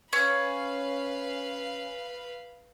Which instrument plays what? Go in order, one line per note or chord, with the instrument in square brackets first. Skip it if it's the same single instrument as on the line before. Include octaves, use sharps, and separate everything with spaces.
[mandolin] C#4 [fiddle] B4 F5